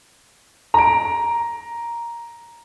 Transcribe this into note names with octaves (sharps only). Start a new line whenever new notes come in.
A#5 D7